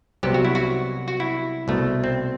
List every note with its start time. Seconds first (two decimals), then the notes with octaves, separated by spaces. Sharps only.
0.23 C2 C3 F#3 B3 G4
0.34 F#4
0.45 E4
0.55 F#4
1.08 F#4
1.20 E4
1.68 C2 B2 A3
2.04 C4